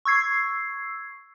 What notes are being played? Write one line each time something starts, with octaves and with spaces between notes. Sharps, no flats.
C#6 E6 G#6 C7